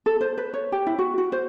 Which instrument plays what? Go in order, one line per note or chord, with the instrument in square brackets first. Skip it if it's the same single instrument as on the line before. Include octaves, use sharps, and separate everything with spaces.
[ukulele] A4
C5
B4
C#5
G4
E4
F#4
F#4
C5